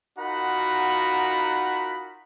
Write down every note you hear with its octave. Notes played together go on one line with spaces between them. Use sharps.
D#4 F4 F#4 A#4 F#5 B5